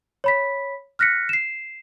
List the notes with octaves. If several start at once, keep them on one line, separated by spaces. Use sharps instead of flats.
C#5 B5 B6
F6 F#6 A#6 B6 C#7
C7 E7